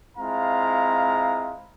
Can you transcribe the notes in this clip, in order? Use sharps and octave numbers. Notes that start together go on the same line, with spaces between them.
G#3 C4 E4 F4 F5 A#5